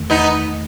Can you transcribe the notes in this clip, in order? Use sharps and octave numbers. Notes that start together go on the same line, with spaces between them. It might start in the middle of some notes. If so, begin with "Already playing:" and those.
Already playing: E2 D#3 A3
B3 D#4